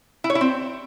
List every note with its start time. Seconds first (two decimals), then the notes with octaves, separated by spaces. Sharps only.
0.24 E4
0.30 C#5
0.35 E4
0.41 C4